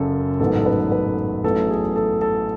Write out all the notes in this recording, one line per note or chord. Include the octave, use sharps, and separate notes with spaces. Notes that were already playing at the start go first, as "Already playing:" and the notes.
Already playing: F#1 F#2 C#3 A4
A1 G#2 F#3 B3 A4
A4
B4
B4
A1 A2 F#3 B3 A4
G#4
A4
A4